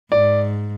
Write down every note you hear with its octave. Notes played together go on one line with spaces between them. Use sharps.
G#2 D5